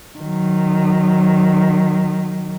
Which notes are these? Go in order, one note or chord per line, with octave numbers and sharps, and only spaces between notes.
D#3 F#3